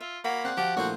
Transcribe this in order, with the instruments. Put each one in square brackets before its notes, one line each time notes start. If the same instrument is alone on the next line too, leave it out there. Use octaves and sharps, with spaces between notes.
[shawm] F4 [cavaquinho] E5
[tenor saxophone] A#3 [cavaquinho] F#4 C#5 [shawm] B5
[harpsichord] C4 [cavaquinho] G#4 D5 G5 [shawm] F#5
[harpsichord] F3 [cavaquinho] F#4 D5 F5 [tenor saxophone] G4
[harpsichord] A#1 A2 C5 [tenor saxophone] F#4 [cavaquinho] D#5 F5